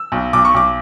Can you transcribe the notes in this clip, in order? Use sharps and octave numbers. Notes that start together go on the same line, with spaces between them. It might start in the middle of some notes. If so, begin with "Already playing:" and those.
Already playing: E6
B1
B1 D6
C#6
B1 D6